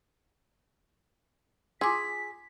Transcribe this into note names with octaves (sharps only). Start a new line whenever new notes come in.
F4 G#4 G#5 C6 D6 E6 B6